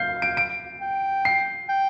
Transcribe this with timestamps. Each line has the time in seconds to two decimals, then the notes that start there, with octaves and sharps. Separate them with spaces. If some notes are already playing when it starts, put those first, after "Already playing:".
Already playing: F5 G6 C7
0.22 D7
0.37 D7
0.81 G5
1.25 C7
1.69 G5